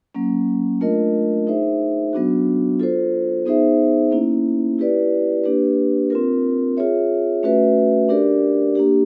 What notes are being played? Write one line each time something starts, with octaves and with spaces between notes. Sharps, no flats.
F#3 A#3 C#4
A3 D4 F4 A#4 D#5
D#4 G#4 C5 E5
F#3 B3 D4 F#4
F4 A4 C5
B3 D#4 G#4 C5 E5
A#3 C#4 E4
E4 G4 B4 D5
A#3 D4 G4 B4
C4 F4 A#4
F4 G#4 C#5 E5
A3 C#4 F#4 B4 E5
D4 G4 A#4 D5
A#3 D4 G4